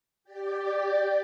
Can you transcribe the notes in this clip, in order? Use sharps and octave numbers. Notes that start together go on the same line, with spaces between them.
G4 D5